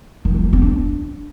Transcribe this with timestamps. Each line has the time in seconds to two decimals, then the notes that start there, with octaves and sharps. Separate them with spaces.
0.25 D#3
0.34 E3
0.43 A3
0.53 C4
0.62 D4